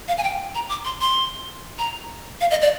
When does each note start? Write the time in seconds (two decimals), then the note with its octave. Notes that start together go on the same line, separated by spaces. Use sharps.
0.08 F5
0.18 G#5
0.23 G5
0.55 A#5
0.69 D6
0.85 C6
1.01 C6
1.79 A#5
2.41 F5
2.51 D#5
2.62 D5